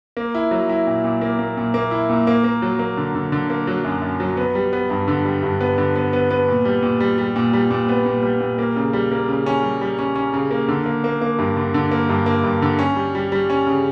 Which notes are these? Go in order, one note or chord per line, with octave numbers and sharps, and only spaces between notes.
A#3
E4
F#3
E4
A#2
A#2
A#3
A#3
A#2
A#3
E4
A#2
A#3
A#3
F#3
A#3
D3
D3
D3
A#3
F#3
F#2
F#2
F#3
B3
G3
B3
G2
D3
G3
G2
B3
D3
B3
B3
B3
A#2
G3
A#2
G3
G3
A#2
G3
A#2
B3
A#2
G3
A#2
A#3
C#3
G3
A#3
C#3
C#4
G3
G3
C#4
C#4
C#3
A#3
D3
A#3
A#3
A#3
G2
D3
D3
A#3
G2
A#3
G2
D3
C#4
G3
G3
G3
C#4
C#3